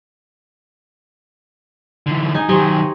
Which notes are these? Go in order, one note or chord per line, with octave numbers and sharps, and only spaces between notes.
D3 E3
D#4 G#5
D#3 F#3 G4 C5 D#5 G#5 C#6